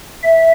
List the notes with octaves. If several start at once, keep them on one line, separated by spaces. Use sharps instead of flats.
E5